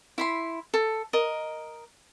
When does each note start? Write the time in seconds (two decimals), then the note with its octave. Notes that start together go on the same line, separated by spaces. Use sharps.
0.18 E4 B5 C6
0.74 A4
1.13 A#4 D#5